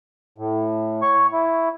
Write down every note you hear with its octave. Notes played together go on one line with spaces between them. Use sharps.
A2
C#5 C#6
E4